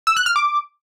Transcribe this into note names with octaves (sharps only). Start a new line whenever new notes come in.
E6
F#6
F6
D6